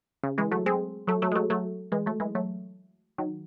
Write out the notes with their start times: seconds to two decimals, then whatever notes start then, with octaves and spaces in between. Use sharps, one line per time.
0.23 C#3
0.38 E3 G#3
0.51 F#3 A3
0.66 G#3 C4
1.07 F#3 A3
1.22 F#3 A3
1.32 G#3
1.36 F#3 A3
1.50 F#3 A3
1.92 E3 G#3
2.06 F#3 A3
2.20 E3 G#3
2.35 F#3 A3
3.18 D#3 F#3